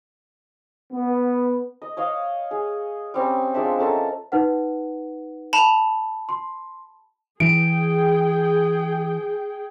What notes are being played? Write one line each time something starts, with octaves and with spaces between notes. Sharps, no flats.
B3
D#5
C#5 D#5 F5
G#4
G3 C4 C#4
F3 G#3 D4 E5
C#4 A4 A#4 A5
D#4 B4 F#5
A5 B5 F7
C6
E3 G#4 G5 D7